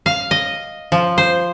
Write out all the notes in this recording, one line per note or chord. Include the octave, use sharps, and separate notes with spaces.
F5
D#5
F3
C5